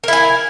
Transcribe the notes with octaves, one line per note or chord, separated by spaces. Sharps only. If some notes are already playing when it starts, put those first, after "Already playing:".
E4 A#4 G#5